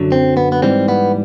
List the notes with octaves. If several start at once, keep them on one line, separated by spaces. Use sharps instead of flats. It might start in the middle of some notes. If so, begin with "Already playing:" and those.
Already playing: F#2 D3 F#3
C4
B3
B3
G#2 E3 G3 C4
B3